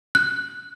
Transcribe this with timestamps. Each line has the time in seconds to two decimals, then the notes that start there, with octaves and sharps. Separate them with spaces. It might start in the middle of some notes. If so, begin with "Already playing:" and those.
0.15 F#6